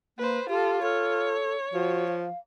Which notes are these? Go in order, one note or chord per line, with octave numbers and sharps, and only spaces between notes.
A#3 B4 C5
F4 G4 A4
F4 A4 C#5
F3 F#4
F5